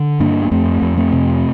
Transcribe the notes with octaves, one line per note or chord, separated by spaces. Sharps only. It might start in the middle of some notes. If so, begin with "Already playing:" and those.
Already playing: D3
G2 A#3 D4
A#3
F2 A3 C4
F2
A3 C4
C3